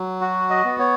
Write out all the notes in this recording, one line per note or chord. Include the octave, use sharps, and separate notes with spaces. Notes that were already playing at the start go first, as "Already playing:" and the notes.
Already playing: F#3
F#4
D#5
B3
C#5